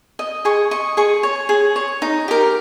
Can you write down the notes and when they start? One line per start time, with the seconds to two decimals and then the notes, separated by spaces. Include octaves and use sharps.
0.19 D#5
0.45 G#4 C#6
0.71 D#5 C#6
0.97 G#4 C#6
1.23 C#5
1.49 G#4
1.76 C#5
2.02 D#4
2.28 G4 A#4